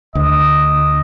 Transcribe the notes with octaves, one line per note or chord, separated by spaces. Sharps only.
D2 D#5